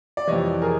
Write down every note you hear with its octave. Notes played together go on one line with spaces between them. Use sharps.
D5
F2 C3 E3 C#5 D#5
G#4 A#4